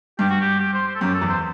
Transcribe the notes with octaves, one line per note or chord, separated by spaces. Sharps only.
G2 G4
F#4
G4
G4
C5
C5
A4
F#2 G4
A4
E2
C5